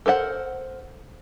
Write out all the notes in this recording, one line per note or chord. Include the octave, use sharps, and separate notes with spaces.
A4 A#4 C5 F#5